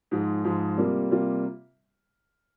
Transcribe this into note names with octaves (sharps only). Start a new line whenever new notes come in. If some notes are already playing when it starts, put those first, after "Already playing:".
G#2 F3 G#3
G#2 F3 G#3
C3 G3 A#3 F4
C3 G3 A#3 F4